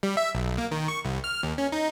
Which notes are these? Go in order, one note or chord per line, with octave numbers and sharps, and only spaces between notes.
G3
E5
B1
A#3
D#3
C#6
C2
F6
D#2
C#4
D#4